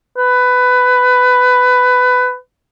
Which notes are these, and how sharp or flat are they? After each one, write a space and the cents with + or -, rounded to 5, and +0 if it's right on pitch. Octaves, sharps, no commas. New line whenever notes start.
B4 +15